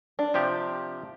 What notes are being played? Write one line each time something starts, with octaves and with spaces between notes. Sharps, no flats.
D4
C3 F3 G4